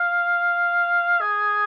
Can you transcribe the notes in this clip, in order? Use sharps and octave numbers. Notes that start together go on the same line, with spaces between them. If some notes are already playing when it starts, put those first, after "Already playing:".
Already playing: F5
G#4